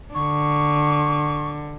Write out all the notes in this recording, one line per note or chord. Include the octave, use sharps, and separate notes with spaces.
D3 C#6